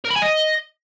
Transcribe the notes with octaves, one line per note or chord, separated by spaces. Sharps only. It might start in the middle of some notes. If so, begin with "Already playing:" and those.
A#4
B5
G#5
D#5